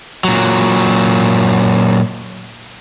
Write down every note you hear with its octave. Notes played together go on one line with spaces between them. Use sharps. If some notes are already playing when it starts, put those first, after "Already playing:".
A#2 F#3